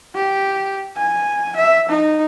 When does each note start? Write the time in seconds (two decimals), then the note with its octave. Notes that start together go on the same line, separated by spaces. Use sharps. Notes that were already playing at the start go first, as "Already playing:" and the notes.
0.15 G4
0.97 G#5
1.56 E5
1.89 D#4